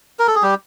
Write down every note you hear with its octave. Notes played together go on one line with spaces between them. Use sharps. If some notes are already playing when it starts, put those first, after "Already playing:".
A#4
A4
G#4
G3 G4